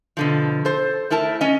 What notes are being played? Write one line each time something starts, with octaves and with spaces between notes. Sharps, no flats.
B2 D3 F3
A4 C5
A3 E4 A#4 A5
C#4 D#5